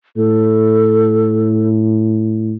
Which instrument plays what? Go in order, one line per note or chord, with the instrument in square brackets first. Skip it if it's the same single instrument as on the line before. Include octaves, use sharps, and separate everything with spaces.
[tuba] A2 [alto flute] A4